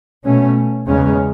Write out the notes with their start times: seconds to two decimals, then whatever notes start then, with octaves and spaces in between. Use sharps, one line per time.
0.25 B2 A3 C#4
0.87 E2 C#3 G#3 C#4